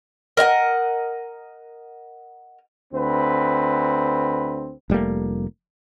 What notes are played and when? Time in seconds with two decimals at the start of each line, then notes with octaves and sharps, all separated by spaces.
0.37 A#4 D#5 F5 F#5
2.93 D2 C4 B4
4.90 F1 G3 A3 A#3